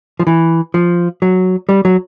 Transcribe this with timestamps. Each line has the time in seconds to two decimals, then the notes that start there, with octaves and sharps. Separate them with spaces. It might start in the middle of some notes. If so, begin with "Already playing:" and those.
0.20 F3
0.27 E3
0.74 F3
1.22 F#3
1.69 G3
1.85 F#3